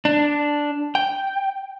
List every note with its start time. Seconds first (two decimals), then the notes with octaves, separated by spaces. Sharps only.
0.05 D4
0.95 G5